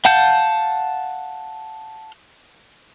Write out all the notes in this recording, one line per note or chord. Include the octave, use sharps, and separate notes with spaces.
F5 F#5 A5 G6